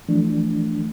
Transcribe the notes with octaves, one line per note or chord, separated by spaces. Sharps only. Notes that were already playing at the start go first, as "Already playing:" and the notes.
E3 F3 A3 D4